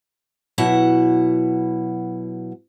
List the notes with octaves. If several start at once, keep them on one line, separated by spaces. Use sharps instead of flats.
B2 F#3 E4 F#5